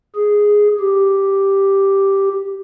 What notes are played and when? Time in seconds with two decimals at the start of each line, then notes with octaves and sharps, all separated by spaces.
0.16 G#4
0.80 G4